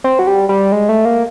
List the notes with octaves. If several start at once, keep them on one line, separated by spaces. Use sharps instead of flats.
C4
F#3
G3
G3
G#3
A3
A#3